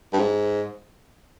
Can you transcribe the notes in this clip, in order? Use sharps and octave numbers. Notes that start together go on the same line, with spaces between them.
G2
G#2